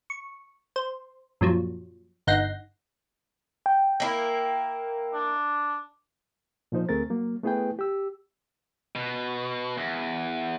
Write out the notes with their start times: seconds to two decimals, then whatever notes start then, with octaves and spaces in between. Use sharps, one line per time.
0.10 C#6
0.76 C5
1.41 F#2 A#2 F3 F#3
2.27 G1 D#4 F#5 G6 A#6 C7
3.66 G5
4.00 A#3 E4
5.14 D4
6.72 A#2 F3 D#4 C5
6.89 D2 A3 C4 G#4 A#4 A6
7.10 F#3 A#3
7.43 A3 B3 E4 G#4 B4 G5
7.79 G4 E6
8.95 B2
9.78 E2